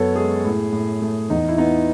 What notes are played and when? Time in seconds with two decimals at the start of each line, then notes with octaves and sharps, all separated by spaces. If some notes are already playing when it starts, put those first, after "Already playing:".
Already playing: F#2 B3 A4 C#5
0.15 G#3 G#4
0.44 A2
0.73 A2
1.02 A3
1.30 E2 D#4
1.49 E4
1.58 B3 D#4